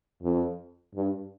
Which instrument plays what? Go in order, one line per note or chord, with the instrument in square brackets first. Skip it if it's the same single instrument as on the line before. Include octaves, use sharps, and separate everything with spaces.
[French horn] F2
G2